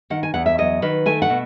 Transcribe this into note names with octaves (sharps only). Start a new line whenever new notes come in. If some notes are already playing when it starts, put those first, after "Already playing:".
D#3 F#5
G#5
E2 F#5
E5
F#3 D#5
D#3 B4
A3 G#5
F#5
B2